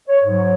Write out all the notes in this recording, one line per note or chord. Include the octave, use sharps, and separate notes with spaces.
C#5
G#2 F#3